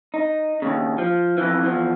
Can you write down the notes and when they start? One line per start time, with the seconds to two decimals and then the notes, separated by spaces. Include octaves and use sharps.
0.14 D#4
0.62 D#2 C#3
0.98 F3
1.38 F2 E3
1.63 E2 F3